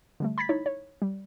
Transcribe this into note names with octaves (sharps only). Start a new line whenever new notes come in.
D3 G3 A3
B5 G#6 A6 B6
D#4 E4 C#5
C#5
G3